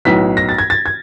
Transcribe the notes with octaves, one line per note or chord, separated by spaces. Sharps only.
B1 A2 F#3 B3 B6
A#6
A6
G#6
A6
G#6